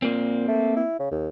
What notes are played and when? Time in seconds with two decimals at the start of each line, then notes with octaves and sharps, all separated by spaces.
0.02 A#2 A#3 C4
0.48 A3
0.76 E4
0.99 C#3
1.11 D#2